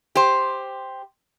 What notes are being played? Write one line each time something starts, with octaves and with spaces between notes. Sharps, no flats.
G4 C5